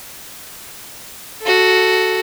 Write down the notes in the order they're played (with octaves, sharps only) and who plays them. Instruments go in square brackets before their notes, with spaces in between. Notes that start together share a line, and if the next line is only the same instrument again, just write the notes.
[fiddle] F#4 A4